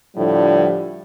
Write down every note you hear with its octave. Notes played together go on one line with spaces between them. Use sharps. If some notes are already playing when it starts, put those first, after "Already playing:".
A2 D3 F3 G3